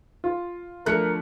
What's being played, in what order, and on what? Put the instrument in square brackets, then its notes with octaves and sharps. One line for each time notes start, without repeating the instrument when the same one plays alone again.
[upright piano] F4
[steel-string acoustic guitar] D3 F3 [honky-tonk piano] A3 [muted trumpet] A#4 [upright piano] F#6 C#7